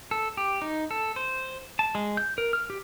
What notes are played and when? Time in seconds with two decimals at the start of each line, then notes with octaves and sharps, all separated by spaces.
0.11 A4
0.37 G4
0.62 D#4
0.91 A4
1.16 C5
1.79 A5
1.95 G#3
2.17 G6
2.38 A#4
2.53 F6
2.70 G4